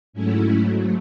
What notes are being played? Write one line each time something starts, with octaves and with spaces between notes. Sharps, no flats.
G#2 F#3 A3 C#4 E4